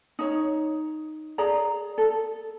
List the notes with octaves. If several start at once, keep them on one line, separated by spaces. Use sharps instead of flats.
D#4 C#5
G#4 D5 A#5
A4